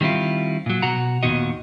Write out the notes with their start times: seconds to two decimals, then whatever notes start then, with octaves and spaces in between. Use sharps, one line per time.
0.01 D#3 G3 C4 E4 F4
0.66 A#2 F#3
0.82 B2 F#4 F#5 A#5
1.23 D#2 A#2 D#3 B3 F#4 D#5